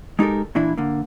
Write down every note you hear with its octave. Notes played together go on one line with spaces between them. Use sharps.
G#3 D#4 G4 A4 A#4
A#2 E3 D4 E4
D3 A#3